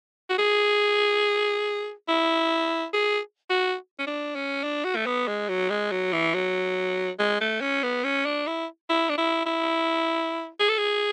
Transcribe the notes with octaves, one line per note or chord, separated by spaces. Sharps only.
F#4
G#4
E4
G#4
F#4
C#4
D4
C#4
D4
F#4
A3
B3
G#3
F#3
G#3
F#3
E3
F#3
G#3
A3
C#4
B3
C#4
D4
E4
E4
D4
E4
E4
G#4
A4
G#4